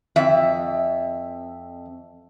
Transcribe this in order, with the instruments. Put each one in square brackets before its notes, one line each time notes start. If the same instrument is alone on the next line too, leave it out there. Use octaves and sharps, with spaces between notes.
[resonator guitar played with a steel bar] F2 E5